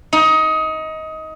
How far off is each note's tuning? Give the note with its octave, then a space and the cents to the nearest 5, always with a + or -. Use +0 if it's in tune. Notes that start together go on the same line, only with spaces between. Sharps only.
D#4 +20